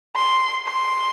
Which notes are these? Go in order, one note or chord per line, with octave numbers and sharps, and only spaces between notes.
C6
C6